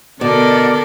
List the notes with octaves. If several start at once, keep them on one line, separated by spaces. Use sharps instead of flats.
B2 D3 A4 A#4 D5